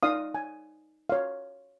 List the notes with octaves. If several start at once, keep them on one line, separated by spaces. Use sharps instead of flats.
D#4 D5 F5 D#6
G#5
C#5 F5